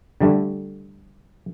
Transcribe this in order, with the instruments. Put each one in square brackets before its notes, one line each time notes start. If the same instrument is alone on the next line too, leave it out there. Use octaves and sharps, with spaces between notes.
[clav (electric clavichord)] D3 G3 A3